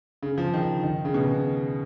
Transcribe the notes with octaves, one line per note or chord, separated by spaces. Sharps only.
C#3
F3
D#3
D#3
C#3
B2